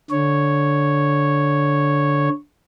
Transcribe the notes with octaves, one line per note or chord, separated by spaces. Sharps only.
D3 C#5